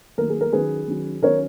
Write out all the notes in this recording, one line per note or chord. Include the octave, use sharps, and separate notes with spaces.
D#3 F#3 A#3 A#4
G#4
A#4
D#3 F#3 C#4 G#4 B4
D#3 F#3 C#4
D#3 F#3 C#4 A#4 C#5